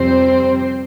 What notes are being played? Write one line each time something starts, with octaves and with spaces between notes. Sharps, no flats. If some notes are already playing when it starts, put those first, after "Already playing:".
Already playing: F2 C3 G3 C4 C5